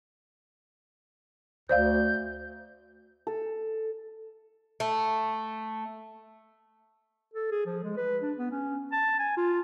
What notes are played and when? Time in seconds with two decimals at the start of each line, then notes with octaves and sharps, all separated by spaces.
1.69 D2 C5 D5 F5 G6
3.27 A4
4.80 A3
7.34 A4
7.51 G#4
7.66 F3
7.84 G#3
7.97 B4
8.23 D4
8.38 B3
8.51 C#4
8.92 A5
9.19 G#5
9.37 F4